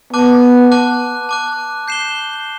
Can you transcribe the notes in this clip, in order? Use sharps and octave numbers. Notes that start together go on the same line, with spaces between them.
B3 A5 D6 F#6
A5 D6 F#6
A5 D6 F#6
G6 C7 E7 G7